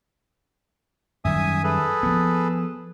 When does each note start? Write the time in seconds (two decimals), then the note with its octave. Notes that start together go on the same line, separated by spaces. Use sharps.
1.25 F#2 D#3 G3 E5 G#5 D#6
1.64 G#4 A4 B4
2.03 F3 B3